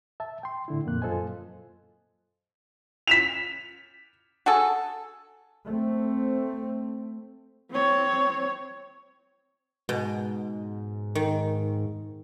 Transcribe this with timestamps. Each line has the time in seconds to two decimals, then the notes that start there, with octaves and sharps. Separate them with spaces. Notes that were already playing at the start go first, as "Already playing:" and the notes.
0.20 E5 A5
0.43 G5 C6
0.68 A2 D3 E4
0.86 F2 A#2 A#3 F#6
1.02 F#2 F4 A4 C5 D#5 G#5
3.07 B6 E7 F7
4.46 F#4 G#4 A4
5.65 A3 C4
7.71 C4 C#5
9.89 G#2 B2
11.15 D#3